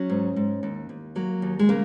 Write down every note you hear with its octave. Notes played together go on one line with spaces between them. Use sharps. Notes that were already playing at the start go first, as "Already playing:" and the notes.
Already playing: F#3 C#4
G#2
G#2
D#2
D#2
F#3 A#3
D#2
G#3
C#3 A#3